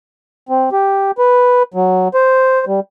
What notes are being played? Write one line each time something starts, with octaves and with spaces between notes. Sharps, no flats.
C4
G4
B4
F#3
C5
G3